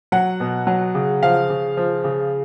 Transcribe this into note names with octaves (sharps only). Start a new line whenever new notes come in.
F#3 F#5
B2
F#3
C#3
F3 F5
C#3
F3
C#3